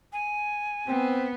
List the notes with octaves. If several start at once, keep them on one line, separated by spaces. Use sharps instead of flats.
G#5
B3 C4